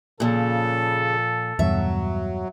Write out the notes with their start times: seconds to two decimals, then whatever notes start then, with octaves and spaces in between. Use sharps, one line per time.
0.20 A#2 C#3 F3 A4
1.59 E2 G2 B2 F#3 E5